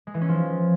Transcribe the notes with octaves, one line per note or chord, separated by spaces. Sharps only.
G#3
E3
C#4
F3